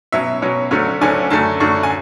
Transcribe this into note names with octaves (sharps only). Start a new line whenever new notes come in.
B2 F#3 C#4 E5
B2 F#3 C#4
D2 D3 F#3 A3 C#4
D2 D3 F#3 A3 C#4 G#5
F#2 D3 A3 A5
F#2 D3 A3 C#6
G#5